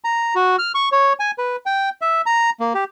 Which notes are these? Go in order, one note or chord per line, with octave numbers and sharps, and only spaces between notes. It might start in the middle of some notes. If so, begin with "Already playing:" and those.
A#5
F#4
F6
C#6
C#5
G#5
B4
G5
E5
A#5
A#3
G4